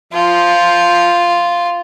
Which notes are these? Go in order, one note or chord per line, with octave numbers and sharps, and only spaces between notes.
F3 F4